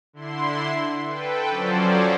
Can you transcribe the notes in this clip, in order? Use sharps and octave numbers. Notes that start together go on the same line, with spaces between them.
D3 E4 C6
A4 B4 G5
F3 F#3 C#4 A4 C5 D5